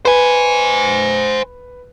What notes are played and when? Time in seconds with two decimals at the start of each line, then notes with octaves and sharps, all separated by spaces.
0.05 B4 C5 G#5